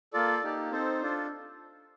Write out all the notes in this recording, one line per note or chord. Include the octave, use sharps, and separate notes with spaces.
A#3 F4 A4 D5
A#3 D#4 G4
C4 D#4 A4 C5
D4 F4 A4